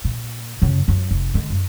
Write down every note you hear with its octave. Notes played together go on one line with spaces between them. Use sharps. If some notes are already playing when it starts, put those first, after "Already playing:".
A#2
F#2 C#3
F#2
F1
D3 G#3
F#2